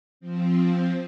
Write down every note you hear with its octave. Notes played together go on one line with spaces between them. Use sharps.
F3 C4